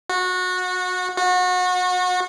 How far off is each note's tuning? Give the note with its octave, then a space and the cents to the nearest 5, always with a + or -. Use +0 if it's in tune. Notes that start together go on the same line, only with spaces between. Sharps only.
F#4 -20
F#4 -30